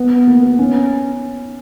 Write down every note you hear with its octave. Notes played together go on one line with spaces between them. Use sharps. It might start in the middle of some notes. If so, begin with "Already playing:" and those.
Already playing: B3
A#3
B3
C#4